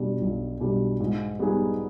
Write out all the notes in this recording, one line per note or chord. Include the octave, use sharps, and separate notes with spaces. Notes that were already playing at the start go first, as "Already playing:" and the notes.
Already playing: B2 G3 D4
B1
B2 G3 D4
G#2
G3 B3 D#4 G#4